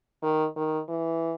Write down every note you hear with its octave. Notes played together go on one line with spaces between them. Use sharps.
D#3
D#3
E3